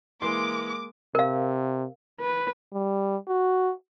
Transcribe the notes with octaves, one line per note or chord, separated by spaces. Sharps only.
E3 G#3 A#3 C6 D6
C3 A#4 F5
B4
G3
F#4